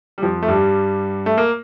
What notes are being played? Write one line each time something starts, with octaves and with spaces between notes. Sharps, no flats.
G3
F2 F3
A3
G2 G3
A3
A#3